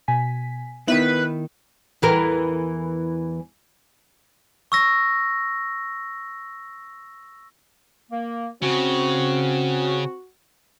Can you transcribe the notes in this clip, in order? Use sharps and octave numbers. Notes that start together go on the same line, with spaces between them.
B2 G#5 B6
D#3 B3 D#4 E4 B4
E2 E3 A#4
C#6 E6 A#6
A#3
C#3 C4 F#4